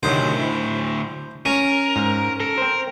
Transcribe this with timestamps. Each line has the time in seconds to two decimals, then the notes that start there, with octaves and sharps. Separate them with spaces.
0.03 D2 A2 C3 D#3 F#3 C5
0.39 E4
1.46 C#4 A#4
1.96 G#2
2.40 A4 A#4
2.58 C4 C5